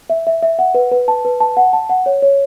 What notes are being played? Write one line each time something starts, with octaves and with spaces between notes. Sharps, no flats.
E5
E5
E5
F#5
B4
B4
A5
B4
A5
F#5
A5
F#5
C#5
C#5